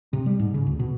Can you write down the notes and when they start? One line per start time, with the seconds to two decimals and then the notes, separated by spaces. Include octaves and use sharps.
0.13 C3
0.26 G3
0.39 G#2
0.54 C#3
0.67 D2
0.80 B2